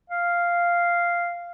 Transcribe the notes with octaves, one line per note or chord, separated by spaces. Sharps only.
F5